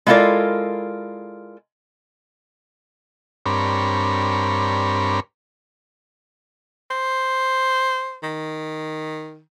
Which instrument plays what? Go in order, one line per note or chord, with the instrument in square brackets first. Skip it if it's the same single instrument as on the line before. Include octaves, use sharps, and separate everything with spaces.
[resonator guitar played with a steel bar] G#3 E4 F4 A4 A#4 D5
[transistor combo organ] G2 C4 D4 A#4 C#5 B5
[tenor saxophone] C5
D#3